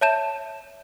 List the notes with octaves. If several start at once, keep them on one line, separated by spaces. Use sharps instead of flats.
C#5 E5 A5 G6 E7